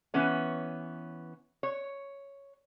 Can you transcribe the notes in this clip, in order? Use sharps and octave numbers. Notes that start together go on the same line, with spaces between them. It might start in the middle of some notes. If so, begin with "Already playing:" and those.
E3 B3 C#4 C#5
C#5